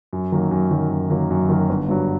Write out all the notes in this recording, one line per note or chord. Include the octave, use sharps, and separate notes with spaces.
F#2
D#3 F#3 A#3
F#2
D#3 F#3 A#3
F#2
D#3 F#3 A#3
F#2
D#3 F#3 A#3
G1
G2 F#3